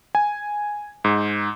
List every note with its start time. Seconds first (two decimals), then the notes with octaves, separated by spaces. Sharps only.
0.15 G#5
1.04 G#2